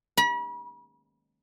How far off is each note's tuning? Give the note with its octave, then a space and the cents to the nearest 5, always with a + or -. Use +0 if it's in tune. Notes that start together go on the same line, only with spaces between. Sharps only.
B5 -40